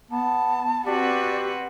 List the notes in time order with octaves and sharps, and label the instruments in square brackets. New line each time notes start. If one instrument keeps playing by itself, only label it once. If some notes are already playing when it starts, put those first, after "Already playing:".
[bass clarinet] B3 [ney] A5
[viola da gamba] C4 F#4 B4 [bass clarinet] G4 [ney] D5